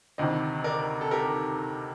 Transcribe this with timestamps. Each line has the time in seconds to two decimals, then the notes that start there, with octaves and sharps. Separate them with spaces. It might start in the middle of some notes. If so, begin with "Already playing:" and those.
0.18 D2 C3 D#3 C5 D#5
0.64 A#4 D5
1.01 A4
1.11 G4 A#4